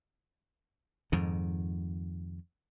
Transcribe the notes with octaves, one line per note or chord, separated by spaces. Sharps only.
F2 G#2 D#3